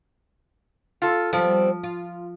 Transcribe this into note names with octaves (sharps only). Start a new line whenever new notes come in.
F4 A4
F3 G3 B3 C4
F4